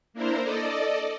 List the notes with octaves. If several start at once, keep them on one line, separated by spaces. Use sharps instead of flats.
A#3 D4 E4 A#4 C5
A4 D5 D#5